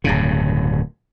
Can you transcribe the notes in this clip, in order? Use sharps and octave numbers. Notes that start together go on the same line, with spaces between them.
D1 G2 C#3